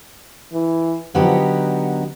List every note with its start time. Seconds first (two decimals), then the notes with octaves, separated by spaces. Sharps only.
0.52 E3
1.14 D3 F3 F#3 B3 D#4 G4